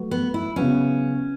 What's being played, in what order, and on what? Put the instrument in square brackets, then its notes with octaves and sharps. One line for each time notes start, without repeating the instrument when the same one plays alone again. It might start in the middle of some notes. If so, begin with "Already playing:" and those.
Already playing: [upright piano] F#3 A3 F#4 B4
[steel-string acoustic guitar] B3
E4
[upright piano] C#3 F#3 B3 F#4 [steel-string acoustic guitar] C#4